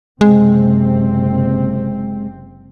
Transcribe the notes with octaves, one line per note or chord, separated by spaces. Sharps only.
F#1 C3 G#3 C4